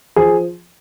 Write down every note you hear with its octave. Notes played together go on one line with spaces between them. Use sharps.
F3 G#4